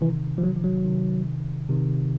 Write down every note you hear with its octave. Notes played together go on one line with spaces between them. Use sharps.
C3 D#3 E3
F3
F#3
F3
F#3
C3 D#3
C3 D#3